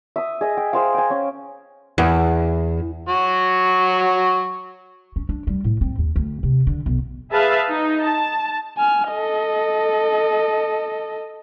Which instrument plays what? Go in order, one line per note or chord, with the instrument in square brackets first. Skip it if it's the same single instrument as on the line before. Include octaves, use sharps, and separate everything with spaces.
[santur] E5 D#6
G#4 D#5 E5
G5
G#4 C5 F5
G5 G#5
C#4
[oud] E2
[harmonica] F#3 F#4 C#6
[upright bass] C#4
D4
G3
A2
C4
D#2
D2
C3
D3
B1
[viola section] G#4 B4 E5 F5 A5
D#4
A5
[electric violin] G#5 F6
A4 D#5